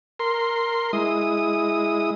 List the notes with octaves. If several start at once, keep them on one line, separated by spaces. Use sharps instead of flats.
A#4 C6
G#3 E4 D#6